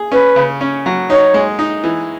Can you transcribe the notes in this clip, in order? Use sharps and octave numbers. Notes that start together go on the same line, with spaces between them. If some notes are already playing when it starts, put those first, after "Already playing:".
Already playing: G#4
C#4 B4
C#3
C#4
F#3
D#4 C#5
G#3
D#4
E3